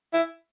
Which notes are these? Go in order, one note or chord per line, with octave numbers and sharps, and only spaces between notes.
E4